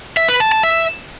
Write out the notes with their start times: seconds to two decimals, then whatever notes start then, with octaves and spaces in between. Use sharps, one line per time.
0.17 E5
0.29 B4
0.40 A5
0.52 A5
0.63 E5